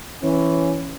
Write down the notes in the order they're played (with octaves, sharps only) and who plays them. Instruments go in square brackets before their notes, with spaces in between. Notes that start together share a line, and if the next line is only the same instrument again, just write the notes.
[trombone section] E3 C#4